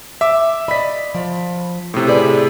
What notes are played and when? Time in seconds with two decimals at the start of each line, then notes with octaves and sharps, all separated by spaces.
0.21 E5 D6
0.68 D5 D#5 B5 B6
1.14 F3
1.94 A2 C3
2.07 G#4 B4 D5